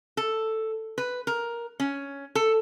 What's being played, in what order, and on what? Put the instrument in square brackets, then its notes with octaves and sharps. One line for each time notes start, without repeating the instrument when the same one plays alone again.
[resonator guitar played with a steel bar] A4
B4
A#4
C#4
A4